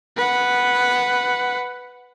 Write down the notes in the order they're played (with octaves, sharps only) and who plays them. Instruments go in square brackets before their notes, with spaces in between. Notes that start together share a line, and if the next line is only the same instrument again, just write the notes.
[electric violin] B4 F#5